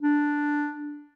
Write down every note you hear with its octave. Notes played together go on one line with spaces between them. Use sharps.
D4